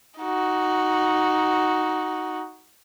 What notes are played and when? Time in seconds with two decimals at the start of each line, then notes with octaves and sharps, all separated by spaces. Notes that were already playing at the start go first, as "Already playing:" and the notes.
0.19 D#4 F#4